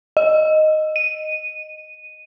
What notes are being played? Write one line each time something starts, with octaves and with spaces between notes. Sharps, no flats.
D#5
D#7